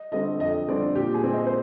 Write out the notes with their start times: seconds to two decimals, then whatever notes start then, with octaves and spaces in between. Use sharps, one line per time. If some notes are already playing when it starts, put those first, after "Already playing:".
Already playing: D#5
0.12 D3 G3 C4 D#5
0.40 F2 D#5
0.68 D3 G3 C4 D5
0.95 A#2 G4
1.14 G#4
1.23 G#3 C4
1.33 D#5
1.47 C5